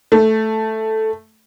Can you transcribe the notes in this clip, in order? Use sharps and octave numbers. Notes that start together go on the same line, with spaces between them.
A3